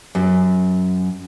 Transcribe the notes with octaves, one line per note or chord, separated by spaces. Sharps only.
F#2